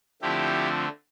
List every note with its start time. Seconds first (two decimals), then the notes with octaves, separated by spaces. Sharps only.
0.22 D3 F3 A3 C4 E4 G4